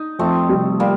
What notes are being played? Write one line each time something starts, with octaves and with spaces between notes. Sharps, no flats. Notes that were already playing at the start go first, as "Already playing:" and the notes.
Already playing: D#4
F2 A3 C4
C3 G3
G3 A#3